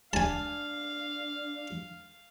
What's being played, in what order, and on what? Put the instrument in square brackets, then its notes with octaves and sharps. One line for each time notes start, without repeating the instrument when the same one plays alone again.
[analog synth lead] D4 [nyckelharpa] F5 [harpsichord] G#5 A5